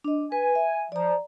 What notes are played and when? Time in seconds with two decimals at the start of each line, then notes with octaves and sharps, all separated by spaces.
0.04 D4 D#5
0.32 B4 G#5
0.55 E5
0.92 F3 D5 A#5